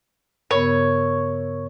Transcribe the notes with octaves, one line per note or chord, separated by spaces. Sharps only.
G2 C#3 B3 A#4 C#5